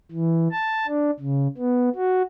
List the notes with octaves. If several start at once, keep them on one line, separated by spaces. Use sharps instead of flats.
E3
A5
D4
C#3
B3
F#4